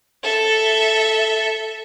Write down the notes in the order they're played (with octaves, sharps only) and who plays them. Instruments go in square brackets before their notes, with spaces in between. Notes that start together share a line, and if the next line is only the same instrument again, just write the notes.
[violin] A4 E5